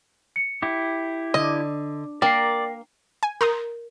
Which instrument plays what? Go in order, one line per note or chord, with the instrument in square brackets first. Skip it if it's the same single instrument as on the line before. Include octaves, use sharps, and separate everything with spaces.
[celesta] C#7
[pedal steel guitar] E4 G4
[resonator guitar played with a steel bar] D3 [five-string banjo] D#5
[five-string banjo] A#3 [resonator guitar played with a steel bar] A#4 [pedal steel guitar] D5 [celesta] G5 C7
[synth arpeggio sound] G#5
[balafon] A#4 [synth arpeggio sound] A#5 C6 D#6